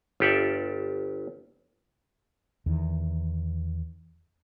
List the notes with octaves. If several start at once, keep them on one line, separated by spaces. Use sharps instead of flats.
G1 F4 G4 A4 D5 E5
E2 D#3